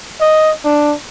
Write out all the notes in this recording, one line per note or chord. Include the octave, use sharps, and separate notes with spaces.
D#5
D4